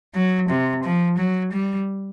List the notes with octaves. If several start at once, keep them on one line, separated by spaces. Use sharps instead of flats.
F#3
C3
F3
F#3
G3